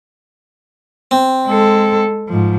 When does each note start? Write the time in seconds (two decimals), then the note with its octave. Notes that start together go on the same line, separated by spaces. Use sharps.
1.11 C4
1.46 G#3 A4
2.29 G#2 F3